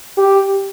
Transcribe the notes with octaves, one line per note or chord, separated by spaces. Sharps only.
G4